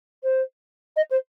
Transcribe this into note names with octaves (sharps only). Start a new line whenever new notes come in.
C5
D#5
C5